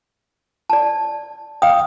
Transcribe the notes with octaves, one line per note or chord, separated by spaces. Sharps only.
D5 A5
F5 G5 D#6